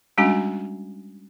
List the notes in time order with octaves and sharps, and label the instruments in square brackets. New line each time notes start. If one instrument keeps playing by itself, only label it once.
[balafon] G3 G#3 C#4 D4 F#4 G#5